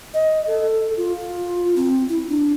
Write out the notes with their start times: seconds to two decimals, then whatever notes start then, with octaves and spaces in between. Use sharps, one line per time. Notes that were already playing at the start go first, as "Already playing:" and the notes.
0.14 D#5
0.47 A4
0.97 F4
1.76 C4
2.09 E4
2.29 D4